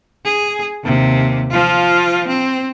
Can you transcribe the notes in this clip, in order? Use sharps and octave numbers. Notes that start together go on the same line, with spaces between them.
G#4
D#2 C3
F3 F4
C4